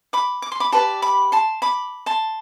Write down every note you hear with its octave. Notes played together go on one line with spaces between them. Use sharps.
B5 D6
D6
C6
B5 D6
G4 B4 D5 A5 C6
B5 D6
A5 C6
B5 D6
A5 C6